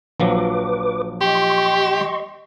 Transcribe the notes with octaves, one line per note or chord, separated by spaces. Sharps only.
A#1 F3 F#3 B4 D6
G4 D#5 C6 C#6